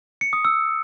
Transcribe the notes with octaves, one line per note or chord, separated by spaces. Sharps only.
C#7
D#6
E6